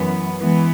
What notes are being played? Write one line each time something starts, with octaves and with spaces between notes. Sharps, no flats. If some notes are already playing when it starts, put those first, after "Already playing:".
Already playing: F#2 E3 B3
E3 G#3 B3